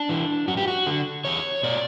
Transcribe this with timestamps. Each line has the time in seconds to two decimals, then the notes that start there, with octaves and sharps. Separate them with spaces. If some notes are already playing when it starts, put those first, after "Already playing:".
Already playing: D4
0.09 E3
0.48 F#2 F#4
0.57 G4
0.68 F#4
0.87 D3
1.25 E2 C#5
1.63 B2 D5